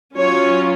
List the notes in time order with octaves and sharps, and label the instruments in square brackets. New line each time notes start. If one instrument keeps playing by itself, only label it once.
[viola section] F#3 C#4 F4 C#5